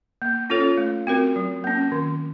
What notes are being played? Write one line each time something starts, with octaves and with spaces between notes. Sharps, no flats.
A#3
C#4 F4 A4 C#5
A3
C4 F#4 A#4
F#3
A#3 C#4
D#3